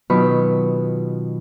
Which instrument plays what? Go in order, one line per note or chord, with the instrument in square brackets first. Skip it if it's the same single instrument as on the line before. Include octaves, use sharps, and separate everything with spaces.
[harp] B2 D#3 F#3 F4 B5 C#6